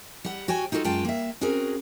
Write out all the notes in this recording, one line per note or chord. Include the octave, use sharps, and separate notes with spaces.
G3 F#5
F#4 C#5 G5 G#5
D#4 F4 F#4 G#4 A4
F#2 G#3 F4 G5 A5
A#3 E5
C4 C#4 F#4 G#4 A#4